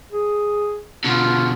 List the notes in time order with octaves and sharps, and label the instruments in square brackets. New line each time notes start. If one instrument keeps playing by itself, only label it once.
[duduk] G#4
[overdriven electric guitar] B2 D3 [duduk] F4